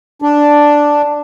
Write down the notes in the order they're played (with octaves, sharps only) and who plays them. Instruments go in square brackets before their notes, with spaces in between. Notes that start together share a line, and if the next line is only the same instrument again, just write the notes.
[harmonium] D4